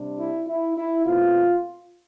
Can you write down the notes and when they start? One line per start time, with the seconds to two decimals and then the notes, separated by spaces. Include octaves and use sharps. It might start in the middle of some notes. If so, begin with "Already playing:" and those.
Already playing: C3 G3 D4
0.19 E4
0.47 E4
0.76 E4
1.05 B2 A3 C4 F4